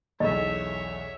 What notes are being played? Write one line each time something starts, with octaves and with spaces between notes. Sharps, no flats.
B1 E2 A4 C#5 D#5 E5